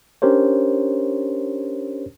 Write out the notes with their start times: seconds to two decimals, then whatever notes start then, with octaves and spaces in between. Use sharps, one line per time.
0.22 C#4 D4 G4 A#4 C5 C#5